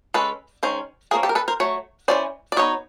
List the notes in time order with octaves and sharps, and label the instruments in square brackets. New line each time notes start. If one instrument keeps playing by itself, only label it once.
[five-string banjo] G#3 C#4 A4 B4
D#3 G#3 C#4 C5
F3 A#3 C#4 G#4 A#4
G4 A4
A#4
A4 B4
A#4 C5
F#3 A3 C#5
E3 A3 C#4 C5 D5
D5
F#3 B3 D#4 C#5 D#5